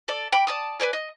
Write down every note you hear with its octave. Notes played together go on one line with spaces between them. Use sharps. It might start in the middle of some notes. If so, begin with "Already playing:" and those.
A4 D5
G5 B5 D6
D5 A5 D#6
B4 C5 D5 G#5
D#5